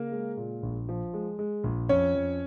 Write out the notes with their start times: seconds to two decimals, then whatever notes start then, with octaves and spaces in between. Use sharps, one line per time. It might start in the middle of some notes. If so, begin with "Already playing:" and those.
Already playing: C#3 A#3 A#4
0.12 G#3
0.37 A#2
0.63 A#1
0.89 F3
1.14 G#3
1.39 G#3
1.64 A#1
1.89 F2 C#4 C#5
2.15 F2